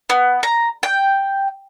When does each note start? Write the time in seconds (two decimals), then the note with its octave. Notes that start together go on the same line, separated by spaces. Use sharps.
0.10 B3
0.43 A#5
0.83 G5